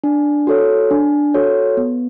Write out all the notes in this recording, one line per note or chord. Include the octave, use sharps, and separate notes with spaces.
D4
F#4 A4 C#5
D4
F#4 A4 C#5
B3